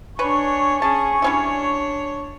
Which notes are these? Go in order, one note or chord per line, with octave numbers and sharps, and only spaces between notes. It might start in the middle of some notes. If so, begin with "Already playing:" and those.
D4 B4 C#5 G#5 C#6
C#4 G#4 A5
G3 C#4 D4 E4 C#5